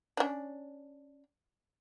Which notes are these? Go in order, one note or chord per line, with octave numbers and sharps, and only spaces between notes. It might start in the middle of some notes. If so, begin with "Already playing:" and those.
C#4 D4